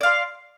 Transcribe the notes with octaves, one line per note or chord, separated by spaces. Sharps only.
D5 F5 C6